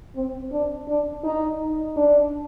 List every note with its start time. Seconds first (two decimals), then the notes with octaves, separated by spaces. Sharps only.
0.15 C4
0.51 D4
0.88 D4
1.24 D#4
1.96 D4